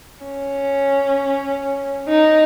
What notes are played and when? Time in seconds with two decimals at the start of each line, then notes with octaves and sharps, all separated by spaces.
0.24 C#4
2.09 D#4